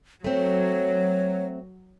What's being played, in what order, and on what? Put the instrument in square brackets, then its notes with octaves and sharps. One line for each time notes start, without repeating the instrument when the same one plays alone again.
[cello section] F#3 [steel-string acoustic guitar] A3 C4 [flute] C#5